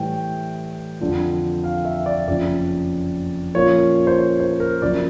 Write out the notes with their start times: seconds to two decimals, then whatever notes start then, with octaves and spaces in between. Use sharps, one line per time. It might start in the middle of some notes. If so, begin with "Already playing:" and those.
Already playing: A2 E3 G3 G5
1.00 F2 D3 F3
1.64 F5
1.85 E5
2.06 D5
2.28 F#1 F2 C#3 F3 D5
3.54 A#2 F3 A#3 C#4 F4 C#5
4.07 C5
4.18 C#5
4.40 C5
4.60 A#4
4.82 F#2 C#3 F3 A#3 D5